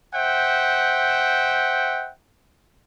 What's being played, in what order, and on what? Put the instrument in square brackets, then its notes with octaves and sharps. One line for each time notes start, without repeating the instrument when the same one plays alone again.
[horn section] C5 E5 F#5 G5